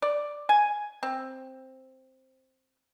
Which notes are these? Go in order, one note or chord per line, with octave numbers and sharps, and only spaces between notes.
D5
G#5
C4